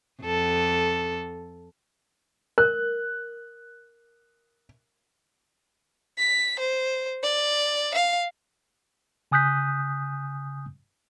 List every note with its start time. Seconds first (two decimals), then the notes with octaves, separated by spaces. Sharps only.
0.23 F2 A4
2.58 A#4 F#6
6.19 B6
6.59 C5
7.23 D5
7.94 F5
9.32 C#3 G#5 D#6 F#6 G6 B6